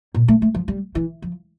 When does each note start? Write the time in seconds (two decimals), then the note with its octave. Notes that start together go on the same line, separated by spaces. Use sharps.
0.14 A#2
0.28 A3
0.42 A3
0.55 F3
0.68 G3
0.95 E3
1.22 F3